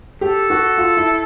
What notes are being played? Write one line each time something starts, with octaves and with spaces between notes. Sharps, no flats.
G4 A4
F#4
F4
E4